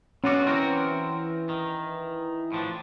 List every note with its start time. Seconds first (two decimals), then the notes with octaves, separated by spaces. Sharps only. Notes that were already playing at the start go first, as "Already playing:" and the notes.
0.24 B2 C#4 F4 F#4 F#5 D6
0.47 E3 C4 F#4 A#4
1.49 D#3
2.52 A2 F3 D4